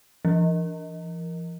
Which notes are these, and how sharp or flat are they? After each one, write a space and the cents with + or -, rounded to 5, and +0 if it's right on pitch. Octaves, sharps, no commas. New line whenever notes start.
E3 +45